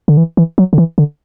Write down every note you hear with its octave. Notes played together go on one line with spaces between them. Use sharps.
D3
E3
E3
F#3
D3
E3
D3